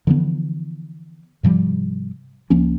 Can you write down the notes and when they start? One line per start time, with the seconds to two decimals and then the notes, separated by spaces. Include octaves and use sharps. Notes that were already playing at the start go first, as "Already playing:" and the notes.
0.07 D3 E3 F3 B3
1.43 G#2 C3 F3 G3
2.50 C#2 F3 A#3 C#4